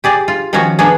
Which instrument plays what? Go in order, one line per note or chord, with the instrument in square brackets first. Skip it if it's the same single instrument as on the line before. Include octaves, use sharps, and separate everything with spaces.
[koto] G4 G#4 D5
F4
D#3 F3 C#4 F#4 C#5
A#3 B3 D4 G#4